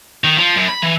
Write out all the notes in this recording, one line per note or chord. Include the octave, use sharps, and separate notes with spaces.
D#3
F3
F#2
B5
E3